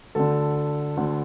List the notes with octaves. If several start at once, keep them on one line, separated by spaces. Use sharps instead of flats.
D2 D3 A4
D2 D3